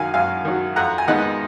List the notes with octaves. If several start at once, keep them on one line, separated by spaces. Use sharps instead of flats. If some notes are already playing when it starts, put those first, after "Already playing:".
Already playing: F#2 D#3 F#3 F5 G#5
F#2 F5 G#5
D#3 F#3
F2 F#5 A#5
G#5
D#3 G#3 B3 D#4 D#5 F#5